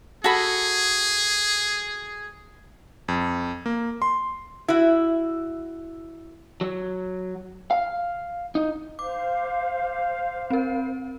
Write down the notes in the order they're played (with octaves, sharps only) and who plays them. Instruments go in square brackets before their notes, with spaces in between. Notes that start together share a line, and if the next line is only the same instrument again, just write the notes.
[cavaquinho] F#4 A4 B5 [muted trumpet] G#4
[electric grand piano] F2
A#3
C6
[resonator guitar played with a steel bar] E4 F#4
[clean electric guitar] F#3
F5
D#4
[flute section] C5 F5 [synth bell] D6
[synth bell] C4 A#4